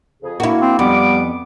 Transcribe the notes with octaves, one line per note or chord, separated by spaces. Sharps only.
F2 C#3 G#4
A#3 D4 E4 F#4
C4
F2 G3 B3 D6